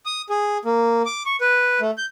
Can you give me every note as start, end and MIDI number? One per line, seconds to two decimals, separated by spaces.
0.06 0.22 87
0.30 0.58 68
0.65 1.02 58
1.06 1.23 86
1.26 1.36 85
1.41 1.80 71
1.80 1.91 57
1.98 2.06 91